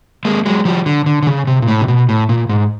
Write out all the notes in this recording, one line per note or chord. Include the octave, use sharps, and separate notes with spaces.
G#3 A#3
F#3 G#3
F3 G3
D3
D3
D3
C#3
C3
A#2
A2
C3
B2
A2
A#2
G#2